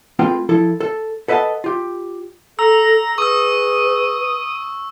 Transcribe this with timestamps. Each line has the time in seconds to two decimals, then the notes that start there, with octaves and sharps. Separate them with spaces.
0.19 A3 C4 F4 G#4 B4 G5
0.49 F3 E4 A4
0.81 A4
1.28 A4 B4 D#5 E5 F#5 A5
1.64 F4 G4
2.59 A4 A#5 E6
3.18 G#4 B4 C#6 D#6 E6